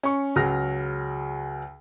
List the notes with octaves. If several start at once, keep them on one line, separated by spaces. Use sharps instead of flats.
C#4 C#6
C#2 F#3 G#4 F6 A#6